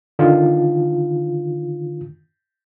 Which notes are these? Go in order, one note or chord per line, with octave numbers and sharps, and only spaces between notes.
D3 D#3 F4